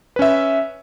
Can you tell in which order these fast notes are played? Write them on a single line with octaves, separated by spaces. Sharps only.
B4 C#4 E5